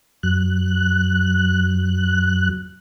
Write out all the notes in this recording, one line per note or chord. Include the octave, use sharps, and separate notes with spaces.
F#2 F#6